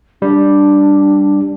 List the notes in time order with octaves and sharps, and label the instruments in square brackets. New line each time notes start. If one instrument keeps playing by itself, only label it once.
[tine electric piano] G3 [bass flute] D4